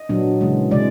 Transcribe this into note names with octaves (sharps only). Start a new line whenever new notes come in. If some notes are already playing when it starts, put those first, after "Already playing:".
Already playing: D#5
A#2 F#3 B3 D4
C#3 E3 G#3
C3 E3 G#3 D5